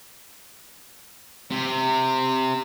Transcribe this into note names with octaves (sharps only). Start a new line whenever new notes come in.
C3